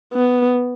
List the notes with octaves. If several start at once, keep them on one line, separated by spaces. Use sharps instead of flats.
B3